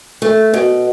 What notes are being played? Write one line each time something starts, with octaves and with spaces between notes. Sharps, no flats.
A3
B2